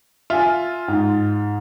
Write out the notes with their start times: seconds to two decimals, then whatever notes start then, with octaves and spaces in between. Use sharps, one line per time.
0.30 F4 E5 G#5
0.88 G#2